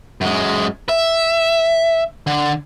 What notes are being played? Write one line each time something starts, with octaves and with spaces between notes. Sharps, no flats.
F#2 G#3
E5
D3